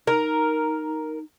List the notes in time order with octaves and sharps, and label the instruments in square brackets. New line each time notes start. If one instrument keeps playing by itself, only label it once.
[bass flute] D#4 [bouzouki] A#4